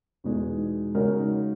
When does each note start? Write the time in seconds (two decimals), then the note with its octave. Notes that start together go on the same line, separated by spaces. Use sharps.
0.24 E2 B2 G#3 D#4 G#4
0.95 C#3 G#3 D#4 F#4 A#4